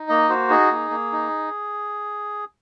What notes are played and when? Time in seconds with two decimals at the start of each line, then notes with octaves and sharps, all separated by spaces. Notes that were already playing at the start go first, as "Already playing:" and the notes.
Already playing: D#4
0.09 A#3 D#5
0.29 F#4 C5
0.50 D#4 G#4
0.71 A#3
0.91 A#3
1.12 D#4